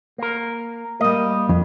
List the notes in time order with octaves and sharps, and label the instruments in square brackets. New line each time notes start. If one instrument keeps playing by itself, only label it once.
[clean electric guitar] A#3 A#4
[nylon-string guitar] G3 A#3 [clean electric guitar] D#5
[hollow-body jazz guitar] F2